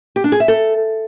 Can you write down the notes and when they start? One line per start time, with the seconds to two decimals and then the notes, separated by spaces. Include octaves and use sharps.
0.16 G4
0.24 D4
0.32 G#4
0.40 E5
0.48 A4